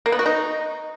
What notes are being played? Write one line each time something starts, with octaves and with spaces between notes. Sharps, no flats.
A#3
B3
F#4
D#4